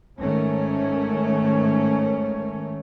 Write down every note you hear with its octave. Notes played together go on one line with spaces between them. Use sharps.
G#2 D#3 A3 C#4